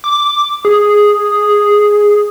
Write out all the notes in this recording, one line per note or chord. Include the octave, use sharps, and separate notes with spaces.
D6
G#4